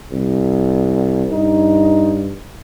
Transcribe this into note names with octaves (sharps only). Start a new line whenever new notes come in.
C2
G2 D#4